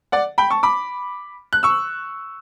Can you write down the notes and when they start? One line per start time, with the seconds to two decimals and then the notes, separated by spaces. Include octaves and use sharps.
0.12 D5 F#5
0.38 G5 B5
0.50 A5 C#6
0.63 B5 D6
1.53 F#6
1.63 C#6 E6